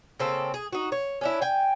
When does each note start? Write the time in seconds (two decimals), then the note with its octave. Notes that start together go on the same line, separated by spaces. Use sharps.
0.20 C#3 A#3 C4 A4
0.54 G#4
0.73 D#4 F#4
0.92 C#5
1.21 C#4 D4 E4
1.41 G5 G#5